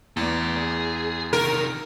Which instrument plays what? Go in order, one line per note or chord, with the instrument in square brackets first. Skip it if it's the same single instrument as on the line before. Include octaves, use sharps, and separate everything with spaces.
[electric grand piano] E2 [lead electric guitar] A3 D5
[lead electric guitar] G#4
[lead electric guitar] C3 D#3 [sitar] A#4